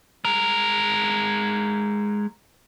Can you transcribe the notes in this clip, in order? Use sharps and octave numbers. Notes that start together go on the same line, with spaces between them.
G#3 A#4